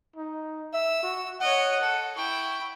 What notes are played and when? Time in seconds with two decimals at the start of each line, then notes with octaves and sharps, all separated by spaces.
0.16 D#4
0.74 E5 E6
1.03 F#4
1.41 C#5 D#5 F#5
1.80 A4
2.17 E4 G5 C#6